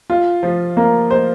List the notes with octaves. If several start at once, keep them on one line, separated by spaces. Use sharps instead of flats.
F4
F3
A#3
C5